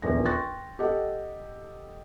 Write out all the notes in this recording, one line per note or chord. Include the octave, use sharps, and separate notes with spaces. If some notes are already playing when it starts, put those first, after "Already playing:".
D#1 A#1 E2 A#6
G5 C6 C#6 F#6 A6 A#6
G4 A4 D#5 F#5